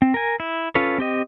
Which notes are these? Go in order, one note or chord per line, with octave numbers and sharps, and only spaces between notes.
C4
A#4 G#5
E4
C#4 F4 A4 B4 C#5
C4 G4 D#5